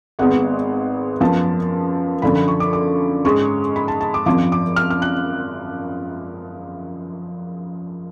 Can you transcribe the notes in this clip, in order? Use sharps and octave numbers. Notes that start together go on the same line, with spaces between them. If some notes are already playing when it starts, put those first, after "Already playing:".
G#1 G#2 G#3 B3 F#5
F#2 F3 B3 A5
F#2 D3 F3 B5
B5
C#6
D6
D6
G#2 G#3 C#4 C#6
B5
A5
A5
D6
G#1 F#2 F3 D6
D6
F6
F6
F#6